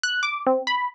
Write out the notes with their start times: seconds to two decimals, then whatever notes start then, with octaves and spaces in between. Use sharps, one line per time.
0.03 F#6
0.23 D6
0.47 C4
0.67 B5